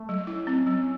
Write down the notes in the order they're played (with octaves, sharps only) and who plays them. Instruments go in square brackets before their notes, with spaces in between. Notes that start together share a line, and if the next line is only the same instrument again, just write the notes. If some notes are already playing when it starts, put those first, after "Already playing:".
Already playing: [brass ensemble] A3
[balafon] F#3
[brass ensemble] C#4 [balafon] E4
[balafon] C4
F#3